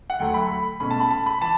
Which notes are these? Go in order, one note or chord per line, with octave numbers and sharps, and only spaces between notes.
F#5
D2 D3 F#3 A3 G5
B5
B2 A3 C#4 B5
A5
B5
A5
B5
E3 A5